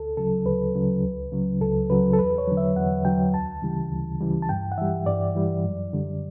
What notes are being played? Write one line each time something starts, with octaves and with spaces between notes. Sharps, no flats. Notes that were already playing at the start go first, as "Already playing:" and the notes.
Already playing: D2 A4
C#3 F#3 A4
D2 B4
C#3 F#3
C#2
C#3 F#3
C#2 A4
C#3 F#3 B4
A4
E2 B4
C#5
D3 F#3
E5
E2 F#5
D3 F#3 G5
D2 A5
C#3 E3 G3
D2
C#3 E3 G3
A5
G2 G5
F#5
E3 G3 E5
G2 D5
E3 G3
F#2
D3 G3